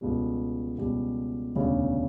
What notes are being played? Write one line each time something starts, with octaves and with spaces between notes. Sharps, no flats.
C#2 B2 G3
C#2 B2 G3
E1 D2 C#3 G3 D4